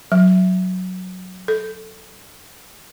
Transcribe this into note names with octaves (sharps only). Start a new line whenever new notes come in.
F#3
A4